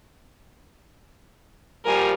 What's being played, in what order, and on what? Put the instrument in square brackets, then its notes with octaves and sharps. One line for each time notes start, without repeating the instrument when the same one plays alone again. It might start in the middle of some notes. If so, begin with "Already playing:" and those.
[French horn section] A#2 F3 G3 [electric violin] A#4 G#5